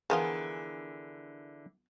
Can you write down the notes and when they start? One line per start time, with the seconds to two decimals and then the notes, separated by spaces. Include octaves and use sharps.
0.10 D3 E3 F3 B3 F4 G#4 A#4 G#5